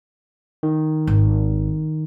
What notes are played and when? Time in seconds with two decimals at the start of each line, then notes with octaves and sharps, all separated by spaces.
0.63 D#3
1.07 G#1